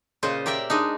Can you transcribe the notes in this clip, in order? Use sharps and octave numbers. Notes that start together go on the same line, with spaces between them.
A#2 C#3 F4 C5 D#5
G4 A#4 D5 E5 G5
G#3 D4 D#4